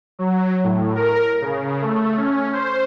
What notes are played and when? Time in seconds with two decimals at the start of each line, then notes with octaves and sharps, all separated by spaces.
0.19 F#3
0.64 A2
0.95 A#4
1.41 C#3
1.82 A3
2.17 C#4
2.53 C5